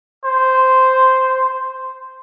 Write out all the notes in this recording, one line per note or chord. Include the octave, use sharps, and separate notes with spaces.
C5